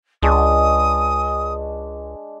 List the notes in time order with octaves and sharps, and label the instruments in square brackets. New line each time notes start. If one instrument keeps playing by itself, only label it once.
[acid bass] C#2 [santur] G#3 D4 C#6 [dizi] D#6